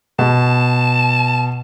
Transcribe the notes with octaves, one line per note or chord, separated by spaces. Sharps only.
B2 A5